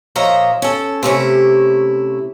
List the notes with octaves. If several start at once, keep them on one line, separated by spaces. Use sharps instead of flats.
A#2 F3 C#5 D#5 E5 A#5
C#4 A4
C3 A3 C#4 E4